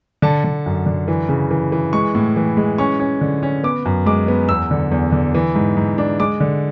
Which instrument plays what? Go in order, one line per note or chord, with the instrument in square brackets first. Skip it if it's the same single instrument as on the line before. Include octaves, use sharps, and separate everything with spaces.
[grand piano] D3 A5
D3
F#2
D3
E3
C#3
E3
E3
G#3 C#6
A2
E3
G#3
C#4 C#6
C#4
D3
C#4
B3 D6
F#2
G#3 D6
B3
E2 E6
D3
E2
D3
E3
G#2
G#2
D4
G#3 D6
D3